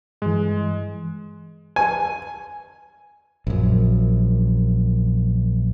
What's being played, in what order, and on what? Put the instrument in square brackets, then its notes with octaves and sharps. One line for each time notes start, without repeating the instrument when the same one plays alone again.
[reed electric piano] G2 E3 [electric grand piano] G#3
[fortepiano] G#5
[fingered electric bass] A#1 F#2